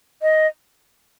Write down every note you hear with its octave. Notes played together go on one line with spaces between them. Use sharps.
D#5